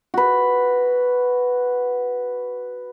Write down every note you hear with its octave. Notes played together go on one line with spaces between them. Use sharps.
F#4 B4